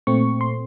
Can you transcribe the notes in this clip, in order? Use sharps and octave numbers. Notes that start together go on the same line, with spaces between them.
A#2 A3 C4 C#6
C6